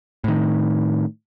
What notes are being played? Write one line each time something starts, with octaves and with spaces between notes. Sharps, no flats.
A2 D#3